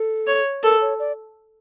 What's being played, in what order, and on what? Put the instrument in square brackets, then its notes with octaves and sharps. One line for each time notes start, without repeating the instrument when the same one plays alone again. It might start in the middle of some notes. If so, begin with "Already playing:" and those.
Already playing: [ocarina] A4
[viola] C#5
[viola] A4 [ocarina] A#4
[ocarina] C#5
D5